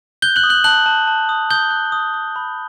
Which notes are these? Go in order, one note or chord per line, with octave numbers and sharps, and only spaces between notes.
F#6 G6 G7
F#6 F#7
D#6
F#6 F#7
A5 F#6 F#7
A5
A5
D#6
D#6 G6 G7
F#6
D#6
D#6
B5